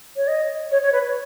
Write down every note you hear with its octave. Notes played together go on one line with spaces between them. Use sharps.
C#5
D#5
C#5
C#5
B4